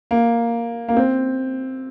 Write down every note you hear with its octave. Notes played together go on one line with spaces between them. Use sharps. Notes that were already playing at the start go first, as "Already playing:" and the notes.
A#3
A#3
C4